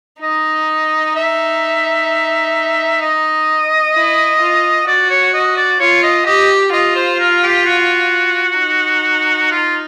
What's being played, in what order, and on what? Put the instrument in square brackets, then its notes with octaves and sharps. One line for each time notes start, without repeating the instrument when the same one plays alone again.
[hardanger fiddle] D#4 [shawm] D#5
[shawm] E5
D#5
[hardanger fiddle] E4
F4
[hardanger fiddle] F#4 [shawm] D5
[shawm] C#5
D#5
D5
[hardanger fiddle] F4 [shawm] C#5
[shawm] D#5
[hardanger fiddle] G4 [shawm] D#5
[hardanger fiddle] F4 [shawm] D#5
[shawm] C5
A#4
G4
F#4
[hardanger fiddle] D#4
[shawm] F4